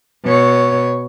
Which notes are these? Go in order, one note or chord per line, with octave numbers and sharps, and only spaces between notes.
B2 C#5